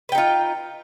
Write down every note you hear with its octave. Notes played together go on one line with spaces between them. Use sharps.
D#4 F4 B4 G5